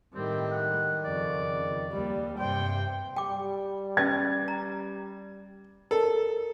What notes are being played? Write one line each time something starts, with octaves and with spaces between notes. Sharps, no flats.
A2 D#3 G3 C4
F#5
F2 C#3 D5
D#2 G3
G2 C3 C5 G5
G3 G5 D6
C#4 B4 G5 G#6 A6
A#5
A4 A#4